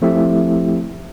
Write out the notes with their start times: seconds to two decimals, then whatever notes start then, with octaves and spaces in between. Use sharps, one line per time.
0.02 F3 A3 C4 E4 G4 E5